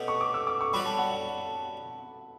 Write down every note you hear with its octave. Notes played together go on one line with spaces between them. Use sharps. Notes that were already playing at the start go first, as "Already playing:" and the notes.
Already playing: B2 A3 C#4 G4 F#5
C#6
D6
E6
D6
C#6
G3 C#4 F#4 B5
A5
F#5
F#5